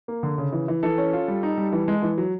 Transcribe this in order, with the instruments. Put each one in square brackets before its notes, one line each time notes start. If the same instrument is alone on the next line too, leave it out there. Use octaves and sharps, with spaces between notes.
[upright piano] A#3
D3
C#3
E3
E3
E3 A4
C#4
F4
G3
D#4
G3
E3
G#3
E3
F#3